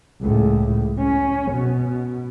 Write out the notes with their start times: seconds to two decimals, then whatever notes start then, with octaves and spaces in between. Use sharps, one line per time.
0.22 C#2 A2
0.98 C#4
1.52 B2